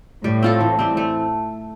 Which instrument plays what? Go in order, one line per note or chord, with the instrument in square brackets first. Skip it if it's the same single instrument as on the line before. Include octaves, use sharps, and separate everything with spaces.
[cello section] A2 [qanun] G3
[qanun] C4 F4 A4
E3
G3 C4
A3